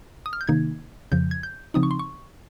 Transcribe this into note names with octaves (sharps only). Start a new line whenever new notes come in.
D#6
F6
G6
C3 D#3 A#3 D#4 G#6
F2 C#3 F3 G6
G#6
G6
C#3 F3 C4 D#4 D#6
C#6
C6
C#6